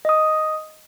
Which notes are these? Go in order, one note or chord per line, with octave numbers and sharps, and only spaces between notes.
D#5 D#6